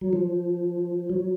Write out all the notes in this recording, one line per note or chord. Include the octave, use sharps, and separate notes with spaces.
F#3
F3
F#3